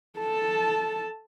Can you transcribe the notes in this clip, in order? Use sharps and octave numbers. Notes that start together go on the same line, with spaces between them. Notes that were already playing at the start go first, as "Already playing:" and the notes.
A4 A5